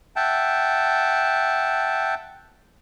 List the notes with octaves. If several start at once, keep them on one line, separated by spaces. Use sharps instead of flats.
E5 F#5 G5 A5